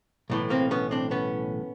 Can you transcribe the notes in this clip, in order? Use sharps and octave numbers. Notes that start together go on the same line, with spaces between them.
B1 A2 E3
A#3 C4
B3 C#4
C4 D4
B3 C#4